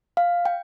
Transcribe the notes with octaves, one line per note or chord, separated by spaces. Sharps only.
F5
G5